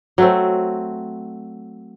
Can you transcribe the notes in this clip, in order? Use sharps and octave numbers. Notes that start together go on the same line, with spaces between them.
F#3 A3 C4